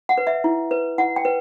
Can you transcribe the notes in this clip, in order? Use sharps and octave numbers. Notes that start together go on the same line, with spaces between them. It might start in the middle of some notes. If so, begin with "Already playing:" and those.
F#5
B4
E5
E4
B4
E4 F#5
G5
B4